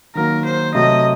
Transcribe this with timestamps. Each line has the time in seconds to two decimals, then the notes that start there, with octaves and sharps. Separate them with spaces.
0.15 D#3 F#3 A#3 A#4
0.45 C5
0.75 C3 F#3 A3 D#5